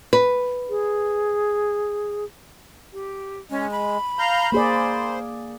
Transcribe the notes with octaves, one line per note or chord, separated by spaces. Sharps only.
B4
G#4
G4
G#3 C#4
B5
F5 A#5 G6
A#3 G#4 C5 D5